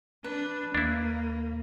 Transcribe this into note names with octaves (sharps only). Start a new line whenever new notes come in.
D4 B4
D#2 A#3 D4 E4